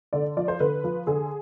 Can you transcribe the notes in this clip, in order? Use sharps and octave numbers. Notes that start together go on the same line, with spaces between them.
D3 D5
F3 D5
C5
D3 B4
F3
D3 G#4